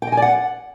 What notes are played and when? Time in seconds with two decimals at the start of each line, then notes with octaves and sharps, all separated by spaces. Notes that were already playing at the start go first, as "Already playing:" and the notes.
0.02 G5
0.07 D#5
0.12 G#5
0.17 D5
0.22 F#5